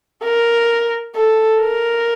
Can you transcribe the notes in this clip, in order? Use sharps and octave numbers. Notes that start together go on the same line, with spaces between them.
A#4
A4
A#4